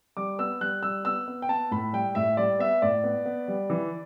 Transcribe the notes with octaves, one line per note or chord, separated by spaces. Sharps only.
G3 D6
B3 E6
G3 F#6
G3 E6
B3 E6
B3
G5
B3 A5
A2 B5
G3 G5
A2 E5
G3 D5
B3 E5
A2 D5
B3
B3
G3
E3